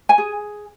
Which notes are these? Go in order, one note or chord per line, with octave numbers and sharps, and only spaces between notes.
G#5
G#4